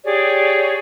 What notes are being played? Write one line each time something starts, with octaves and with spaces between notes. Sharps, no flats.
G4 G#4 C#5 D5